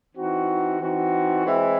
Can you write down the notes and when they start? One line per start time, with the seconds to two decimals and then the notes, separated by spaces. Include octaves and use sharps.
0.15 E3 C4 D#4 F#4
0.81 E3 C4 D#4 F#4
1.45 E3 G#3 C4 E4